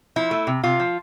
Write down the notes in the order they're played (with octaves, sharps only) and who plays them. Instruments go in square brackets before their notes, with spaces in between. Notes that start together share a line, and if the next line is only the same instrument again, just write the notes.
[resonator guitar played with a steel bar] F3 E4
A3
C3
C3 F4
F3